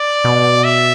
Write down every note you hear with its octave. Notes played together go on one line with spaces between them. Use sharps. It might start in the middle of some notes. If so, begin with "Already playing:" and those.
Already playing: D5
B2
E5